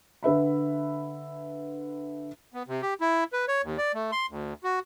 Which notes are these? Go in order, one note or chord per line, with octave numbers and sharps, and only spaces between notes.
D3 B4 E5 B5
B3
C3
G4
E4
B4
C#5
D#2
D5
A3
C6
D2
F#4